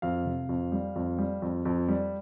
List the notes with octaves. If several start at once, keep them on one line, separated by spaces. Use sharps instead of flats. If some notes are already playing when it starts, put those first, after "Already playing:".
F2 F5
C3
F2
G3
F2
G3
F2
F2
G3